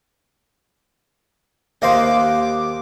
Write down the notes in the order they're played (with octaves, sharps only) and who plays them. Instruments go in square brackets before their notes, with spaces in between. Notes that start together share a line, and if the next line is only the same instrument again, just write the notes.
[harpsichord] D#2 A#3 C5 [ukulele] D#5 F5 [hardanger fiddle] D6